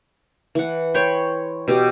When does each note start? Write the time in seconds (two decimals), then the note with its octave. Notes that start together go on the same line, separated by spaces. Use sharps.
0.55 E3 F#5
0.94 C#5 G5 B5 C6
1.68 B2 G4